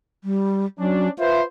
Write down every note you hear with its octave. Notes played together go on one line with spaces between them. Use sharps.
G3
F#3 C#4 D4
F4 B4 C5 E5